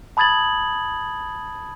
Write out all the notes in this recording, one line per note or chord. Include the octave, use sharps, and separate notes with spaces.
A5 B5 D#6 G#6 A6 F#7